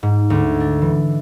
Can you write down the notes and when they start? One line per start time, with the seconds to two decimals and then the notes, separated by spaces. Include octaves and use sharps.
0.03 G#2
0.30 D2
0.60 D4
0.82 E3